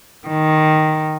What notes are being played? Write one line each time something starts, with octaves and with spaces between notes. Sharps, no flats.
D#3